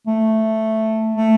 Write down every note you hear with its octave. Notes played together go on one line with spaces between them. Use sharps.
A3
A3